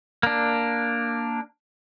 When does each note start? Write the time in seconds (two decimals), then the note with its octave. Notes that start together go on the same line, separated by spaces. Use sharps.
0.23 A#3 D4